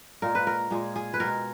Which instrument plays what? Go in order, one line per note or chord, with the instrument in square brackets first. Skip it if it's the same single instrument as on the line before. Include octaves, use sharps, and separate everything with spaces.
[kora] A#2 G#3 A#4
B4
A#4
A#2 G#3 G#4
G#4
B4
B2 G#3 A#4